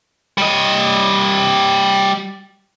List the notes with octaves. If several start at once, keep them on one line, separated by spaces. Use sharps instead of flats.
G3 D#5